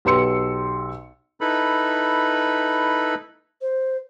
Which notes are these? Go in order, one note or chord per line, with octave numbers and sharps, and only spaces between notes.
B1 G4 B4 C6 E6 C#7
D#4 E4 A4 B4 B5
C5